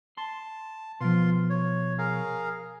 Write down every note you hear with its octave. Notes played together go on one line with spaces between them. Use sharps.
A5 C6
B2 F3 F4 C6
C#5
G#4 A#4 F5